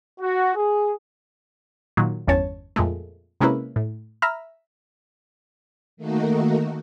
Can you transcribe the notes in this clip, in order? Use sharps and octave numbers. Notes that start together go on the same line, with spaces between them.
F#4
G#4
A#2 D#3 F#3
G1 E2 C#4 C#5 A5
F2 A#2 G#3 A3
C3 G#3 A#3 C#4 E4 B4
A2
E5 A#5 B5 F6
D#3 A3 A#3 D#4 F#4